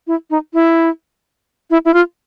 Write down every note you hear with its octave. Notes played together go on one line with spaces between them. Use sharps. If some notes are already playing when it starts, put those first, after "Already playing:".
E4
D#4
E4
E4
E4
F4